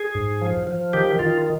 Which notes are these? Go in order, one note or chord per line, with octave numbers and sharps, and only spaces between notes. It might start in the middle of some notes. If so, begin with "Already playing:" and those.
Already playing: G#4
G#2
F3
F3
D#3 G4
D#3 F4